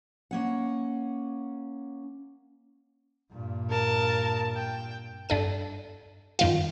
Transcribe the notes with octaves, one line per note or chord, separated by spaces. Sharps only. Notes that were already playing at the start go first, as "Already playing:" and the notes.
A#3 C#4 F#5
G2 A#2
A#4 A5
G5
G2 D4 A4 D#7
F#2 D#3 F4